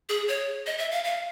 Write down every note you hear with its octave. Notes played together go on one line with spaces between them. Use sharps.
G#4
C#5
D#5
E5
F5
F5